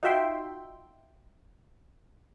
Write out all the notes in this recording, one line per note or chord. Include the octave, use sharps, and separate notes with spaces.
D#4 F4 F#4 E5 G5 C6